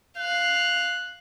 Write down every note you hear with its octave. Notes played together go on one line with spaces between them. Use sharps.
F5 F#6